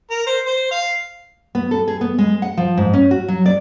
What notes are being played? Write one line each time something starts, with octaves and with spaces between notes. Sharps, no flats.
A#4
C5
C5
F5
B3
A4
G#4
B3
G#3
F#5
F3
G#2
C#4
F#4
F#3
D5